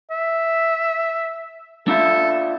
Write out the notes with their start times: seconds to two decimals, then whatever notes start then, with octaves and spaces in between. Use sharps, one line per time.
0.10 E5
1.88 D4 F4 A4 E5